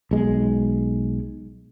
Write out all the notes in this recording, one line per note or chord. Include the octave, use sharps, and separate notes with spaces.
B1 G#3